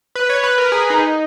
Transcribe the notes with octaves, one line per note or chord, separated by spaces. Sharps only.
B4
C#5
B4
A#4
G#4
D#4